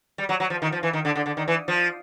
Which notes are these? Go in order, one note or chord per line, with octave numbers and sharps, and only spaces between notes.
G3
F#3
F#3
F3
D#3
F3
E3
D#3
D3
D3
D3
D#3
E3
F3